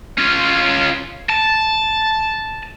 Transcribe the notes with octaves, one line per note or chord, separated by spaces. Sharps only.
C#4 F4
A5